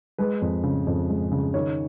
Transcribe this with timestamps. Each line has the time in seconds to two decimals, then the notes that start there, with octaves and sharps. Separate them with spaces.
0.18 G#3 B4
0.42 F2
0.64 C#3
0.87 F2
1.09 G#3
1.32 C#3
1.54 D#3 C#5